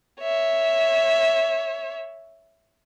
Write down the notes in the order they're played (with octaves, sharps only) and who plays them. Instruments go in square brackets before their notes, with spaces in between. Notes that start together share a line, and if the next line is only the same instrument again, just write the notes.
[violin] C#5 E5